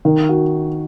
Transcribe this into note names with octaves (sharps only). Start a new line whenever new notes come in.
D#3
F#4